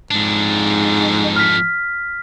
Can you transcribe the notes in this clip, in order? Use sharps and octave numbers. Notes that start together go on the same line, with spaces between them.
F2 G#2 D4
F6 B6